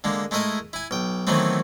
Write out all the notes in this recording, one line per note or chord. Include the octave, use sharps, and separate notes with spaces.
D3 G#3 A#3
G#3 A3 E4 A#4 D#5 G#5
E4 G#5
B1 G5
D#3 E3 F#3 A3 B3 C4